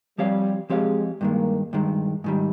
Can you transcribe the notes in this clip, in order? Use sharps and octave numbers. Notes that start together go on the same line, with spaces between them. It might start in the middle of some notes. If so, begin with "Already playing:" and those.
F3 G3 C4 G4 C#5 F5
F3 G#3 C4 G4 C#5 F5
G2 D#3 G#3 A#3
G2 D#3 G#3
G#2 D#3 G3